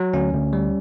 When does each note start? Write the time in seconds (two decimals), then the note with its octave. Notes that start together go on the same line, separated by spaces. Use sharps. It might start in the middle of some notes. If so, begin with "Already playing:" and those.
Already playing: F#3
0.13 D2 C#4
0.33 D2
0.53 G3